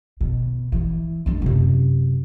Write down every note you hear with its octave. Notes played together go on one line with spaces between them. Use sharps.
B2
E3
A3 D4
F#2 C3